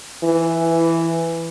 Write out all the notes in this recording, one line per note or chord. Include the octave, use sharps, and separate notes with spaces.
E3